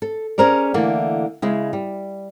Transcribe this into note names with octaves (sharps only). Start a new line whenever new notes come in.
A4
C#4 G#4 A#4 C5 D5
D3 E3 A3 A#3
C#3 G#3 E4
G3